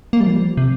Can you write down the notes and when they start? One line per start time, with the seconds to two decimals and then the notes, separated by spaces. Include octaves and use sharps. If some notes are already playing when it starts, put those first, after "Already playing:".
0.13 A#3
0.21 G3
0.27 F3
0.57 C3